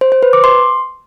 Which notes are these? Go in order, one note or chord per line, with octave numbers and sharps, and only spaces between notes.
C5
C5
B4
D6
C6